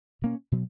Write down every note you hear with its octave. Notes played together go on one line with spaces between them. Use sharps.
B2 A#3 C#4
B2 F#3